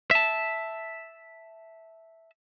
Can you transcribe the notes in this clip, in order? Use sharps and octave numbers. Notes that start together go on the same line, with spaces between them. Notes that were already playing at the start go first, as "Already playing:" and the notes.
E5 A5